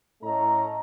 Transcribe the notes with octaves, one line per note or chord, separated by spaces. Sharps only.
A2 A3 C#4 A4 D#5 A#5